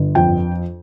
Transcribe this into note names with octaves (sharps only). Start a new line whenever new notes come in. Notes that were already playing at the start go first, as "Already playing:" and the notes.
Already playing: G1
F2 G5